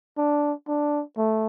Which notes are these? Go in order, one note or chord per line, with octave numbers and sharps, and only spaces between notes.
D4
D4
A3